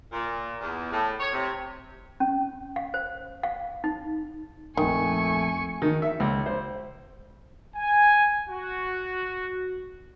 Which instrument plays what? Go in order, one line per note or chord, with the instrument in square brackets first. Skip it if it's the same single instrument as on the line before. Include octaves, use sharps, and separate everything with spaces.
[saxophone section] A#2
E2
A2
C#5
C3
[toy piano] C#4
F5
C5
F5
D#4
[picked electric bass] A#1 F2 [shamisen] D#3 [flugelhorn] A3 [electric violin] G#5 C#6
[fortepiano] D#3
E5
C#2
C5
[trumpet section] G#5
F#4